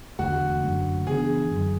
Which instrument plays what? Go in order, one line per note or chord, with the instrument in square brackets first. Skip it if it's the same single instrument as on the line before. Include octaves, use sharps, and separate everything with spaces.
[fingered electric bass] E2 D3 A3 [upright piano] F#4
[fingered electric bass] F#2 D3 A3
[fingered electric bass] C#3 E3 B3 D4 [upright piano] G#4
[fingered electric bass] F#2 D3 F#3